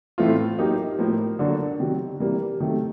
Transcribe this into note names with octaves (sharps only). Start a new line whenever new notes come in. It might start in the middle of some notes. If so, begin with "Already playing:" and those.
A2 E3 A3 C4 F4
F#3 A#3 D#4 G4
A2 F3 A#3
D3 F#3 A#3 D4 F#4
C3 D#3 F#3
C3 E3 G3 A#3
C3 D#3 F#3 A3